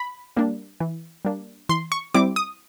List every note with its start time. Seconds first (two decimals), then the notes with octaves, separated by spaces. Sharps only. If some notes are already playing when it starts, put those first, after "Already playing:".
Already playing: B5
0.36 G3 A#3 D4
0.80 E3
1.25 G3 A#3 D4
1.69 E3 C6
1.92 C#6
2.14 G3 C4 E4 D6
2.36 D#6